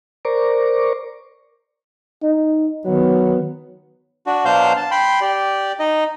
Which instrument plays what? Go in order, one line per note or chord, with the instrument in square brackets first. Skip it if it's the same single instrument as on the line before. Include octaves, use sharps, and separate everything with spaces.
[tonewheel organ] A#4 C5 D5 A#5 C#6 D6
[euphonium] D#4
[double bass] D#3 B3 [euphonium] F#3
[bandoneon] D4 F#4
B2 F#3 D4 C5 F5 G6
A5
G5 B5 C6
G4 D5
D#4 D#5